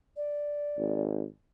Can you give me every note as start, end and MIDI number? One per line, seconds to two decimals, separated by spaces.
0.16 1.03 74
0.78 1.24 32